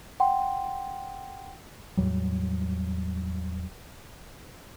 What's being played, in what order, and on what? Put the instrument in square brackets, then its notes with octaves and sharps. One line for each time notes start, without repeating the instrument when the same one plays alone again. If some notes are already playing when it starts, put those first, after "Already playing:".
[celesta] F#5 G5 C6
[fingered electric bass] E2 A2 F#3 G3